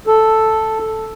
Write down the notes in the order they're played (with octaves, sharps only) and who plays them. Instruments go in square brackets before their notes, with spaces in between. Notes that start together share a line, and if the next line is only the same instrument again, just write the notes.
[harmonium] A4